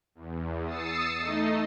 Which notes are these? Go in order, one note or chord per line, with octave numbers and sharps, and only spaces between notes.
E2
D#6 E6 A6 C7 C#7 E7
A3 D#4 D#5